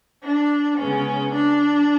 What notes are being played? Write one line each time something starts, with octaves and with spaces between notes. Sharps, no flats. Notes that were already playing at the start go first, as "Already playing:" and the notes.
D4
C#3 G#3 B3 C#4
D4